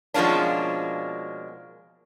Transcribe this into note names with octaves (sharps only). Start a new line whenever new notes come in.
B2 F3 G#3 A#3 C#4 D4